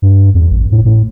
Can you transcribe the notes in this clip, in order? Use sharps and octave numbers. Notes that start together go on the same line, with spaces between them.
G2
E2
A1
A2
A2